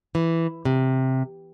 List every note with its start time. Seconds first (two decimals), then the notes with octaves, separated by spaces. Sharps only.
0.15 E3
0.65 C3